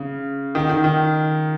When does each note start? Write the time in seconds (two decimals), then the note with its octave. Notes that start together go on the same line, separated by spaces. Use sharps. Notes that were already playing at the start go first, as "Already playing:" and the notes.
Already playing: C#3
0.55 D#3
0.70 D#3
0.84 D#3